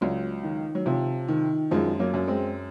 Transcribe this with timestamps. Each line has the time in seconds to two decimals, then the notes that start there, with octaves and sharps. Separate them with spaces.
0.01 C#2 F#3
0.43 D#3
0.75 F#3
0.86 C3 F3
1.28 D#3
1.71 F#2 F3 G#3
2.00 F#3 A#3
2.14 F#2
2.28 G#3 C4